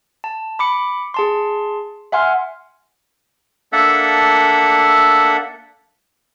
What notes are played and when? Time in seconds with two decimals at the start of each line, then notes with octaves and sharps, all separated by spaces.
0.24 A5
0.59 B5 D6 C#7
1.14 G#4 A5 C6
2.12 E5 F#5 G#5 C6 F6
3.73 A#3 D4 A4 E5 F#5